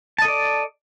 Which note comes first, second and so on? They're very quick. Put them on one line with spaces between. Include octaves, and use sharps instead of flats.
A5 D#5 A4 D5